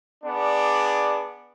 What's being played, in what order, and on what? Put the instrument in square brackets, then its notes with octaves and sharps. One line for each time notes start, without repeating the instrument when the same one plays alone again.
[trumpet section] B3 D4 G#4 D5